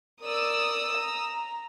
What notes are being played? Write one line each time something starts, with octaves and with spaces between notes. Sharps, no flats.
A#4 D5 D#6 E6
A#5